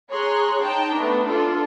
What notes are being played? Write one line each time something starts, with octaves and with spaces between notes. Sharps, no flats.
G#4 C#5 A#5 C6 F#6
D#4 G5 A5 A#5
A3 B3 D4
D4 F4 A4